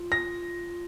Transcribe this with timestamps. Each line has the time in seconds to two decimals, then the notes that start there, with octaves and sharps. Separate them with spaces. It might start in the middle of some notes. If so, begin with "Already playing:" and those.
Already playing: F4
0.12 A#6